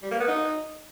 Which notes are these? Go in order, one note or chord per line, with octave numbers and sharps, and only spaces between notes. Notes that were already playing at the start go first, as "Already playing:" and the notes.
G3
A#3
B3
D#4